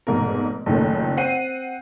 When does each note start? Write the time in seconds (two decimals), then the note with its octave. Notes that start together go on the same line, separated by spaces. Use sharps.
0.07 F1 G#2 B2 A#4
0.66 F#1 A#2 D#3 A3 C#4
1.17 C4 F#5 C7 D#7